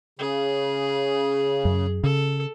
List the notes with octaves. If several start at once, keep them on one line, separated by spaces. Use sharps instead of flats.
C#3 G#4
F#2
C#3 A4